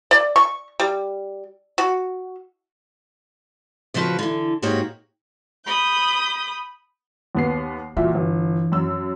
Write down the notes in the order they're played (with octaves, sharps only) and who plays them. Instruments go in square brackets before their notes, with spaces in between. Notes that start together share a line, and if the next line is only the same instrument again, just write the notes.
[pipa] D5
C#6
G3
F#4
[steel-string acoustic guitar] D2 C#3 F3 E4 F#4 B4
D3 E3
G#2 A#3 D#4 F#4 G4 C#5
[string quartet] B5 D#6 G6
[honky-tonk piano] D#2 B3 C7
[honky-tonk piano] A#2 F#4 E5 [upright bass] E3
[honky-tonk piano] G1
F#2 E6